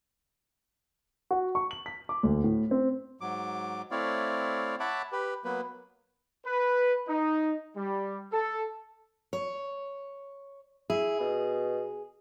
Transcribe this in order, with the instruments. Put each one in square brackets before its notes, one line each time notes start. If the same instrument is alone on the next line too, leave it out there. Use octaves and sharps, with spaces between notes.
[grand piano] F#4
C#6
F#7
B6
D6
D2
A2
C4
[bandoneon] G#2 F#3 D6
A3 C4 E4 C#5 D5 F5
C#5 E5 F#5 A5 B5 D6
G4 B4
F#3 A#3 B3 B4
[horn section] B4
D#4
G3
A4
[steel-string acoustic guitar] C#5
[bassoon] E4 [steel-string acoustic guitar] G#4
[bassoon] B2